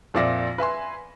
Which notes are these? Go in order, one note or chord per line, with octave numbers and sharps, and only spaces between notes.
F2 A#2 F3 D5 E5 A#6
B4 E5 G#5 C6